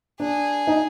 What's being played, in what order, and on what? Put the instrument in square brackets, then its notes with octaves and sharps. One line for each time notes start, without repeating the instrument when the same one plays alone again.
[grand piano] D4 [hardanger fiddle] G#4
[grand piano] D#4